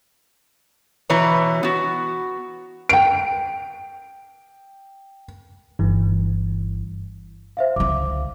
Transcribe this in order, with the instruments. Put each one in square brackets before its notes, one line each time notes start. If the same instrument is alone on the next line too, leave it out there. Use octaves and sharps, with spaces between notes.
[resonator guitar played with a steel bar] B2 E3 B4 C#5 A#5
B3 F#4
[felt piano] G5 D7
[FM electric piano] G1 G2 E3
[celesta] C5 E5 F5
[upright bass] C#2 D3 [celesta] D6